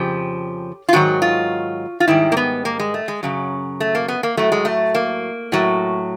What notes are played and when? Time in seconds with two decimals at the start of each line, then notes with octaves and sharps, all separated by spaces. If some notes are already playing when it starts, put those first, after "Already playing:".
Already playing: F2 C#3 F3 G4
0.89 F4
0.93 G#2 D#3 F#3 F#4
1.22 F4
2.00 F4
2.08 G#2 D#3 G3 E4
2.32 A#3
2.37 B3
2.65 A#3
2.79 G#3
2.94 A3
3.08 G#3
3.23 F#2 C#3 F#3
3.80 A3
3.95 A#3
4.08 B3
4.23 A#3
4.37 A2 F#3 A3
4.52 G#3
4.65 A3
4.95 A#3
5.52 A2 F#3